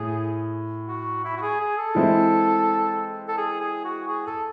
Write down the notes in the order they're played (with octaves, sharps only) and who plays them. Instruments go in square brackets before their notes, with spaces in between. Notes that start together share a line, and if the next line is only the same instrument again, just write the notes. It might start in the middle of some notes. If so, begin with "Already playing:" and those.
Already playing: [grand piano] A2 [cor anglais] G#4
[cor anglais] F#4
E4
F#4
G#4
G#4
A4
[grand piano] E3 G#3 C4 E4
[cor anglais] A4
G#4
G#4
F#4
G#4
A4